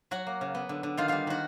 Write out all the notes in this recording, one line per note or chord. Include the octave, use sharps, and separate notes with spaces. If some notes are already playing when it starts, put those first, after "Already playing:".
F#3 F#4 F#5
A#3
C#3
B3
D3
D3
D#3 F4 F5
G3 F4 F5
D#3 F#4 F#5